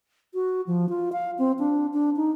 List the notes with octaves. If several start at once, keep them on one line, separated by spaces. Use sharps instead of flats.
F#4
F3
F4
F5
C4
D4
D4
D#4